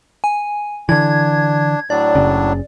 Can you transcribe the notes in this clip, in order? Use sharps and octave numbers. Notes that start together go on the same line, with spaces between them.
G#5
D3 E3 D4 G#6
A2 F#3 D4 D5
F#1 C#3